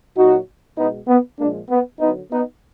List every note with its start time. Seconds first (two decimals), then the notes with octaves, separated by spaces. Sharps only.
0.16 A#2 F#3 D#4 F#4
0.77 B2 G#3 B3 D#4
1.08 B3
1.39 A#2 F3 G#3 A#3 D4
1.70 B3
2.00 D3 F#3 B3 D#4
2.31 B3 D#4